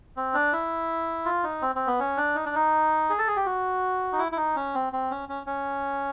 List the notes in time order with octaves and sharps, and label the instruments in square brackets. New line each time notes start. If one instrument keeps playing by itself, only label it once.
[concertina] C4
D4
E4
F4
D#4
C4
C4
B3
C#4
D4
D#4
D4
D#4
G#4
A4
G#4
G4
F#4
D#4
E4
E4
D#4
C#4
C4
C4
C#4
C#4
C#4